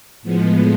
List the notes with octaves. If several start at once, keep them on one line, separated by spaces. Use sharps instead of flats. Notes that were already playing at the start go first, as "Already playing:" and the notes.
A2 F3 G#3 B3